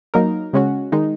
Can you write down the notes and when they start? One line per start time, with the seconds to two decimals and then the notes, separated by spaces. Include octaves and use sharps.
0.14 F#3 A#3 D#4 A#4
0.53 C#3 G#3 C#4 F#4
0.92 D#3 G#3 D#4